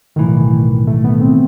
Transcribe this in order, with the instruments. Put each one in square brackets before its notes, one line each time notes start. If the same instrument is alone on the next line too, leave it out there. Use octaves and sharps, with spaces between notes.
[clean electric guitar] B1 A2 E3 [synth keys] D#3
[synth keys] A3
B3
C4